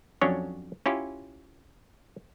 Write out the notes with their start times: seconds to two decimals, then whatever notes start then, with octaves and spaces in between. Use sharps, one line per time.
0.21 F2 F#3 C#4 D4 C#5
0.86 C#4 E4 F4 G4